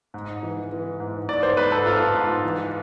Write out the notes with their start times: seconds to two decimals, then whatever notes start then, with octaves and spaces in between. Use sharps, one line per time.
0.14 G#2
0.43 E3
0.72 E3
1.00 G#2
1.29 G#2 D5
1.43 C5
1.57 G#2 B4
1.72 A4
1.86 G#2 F4
2.16 G#2
2.44 E3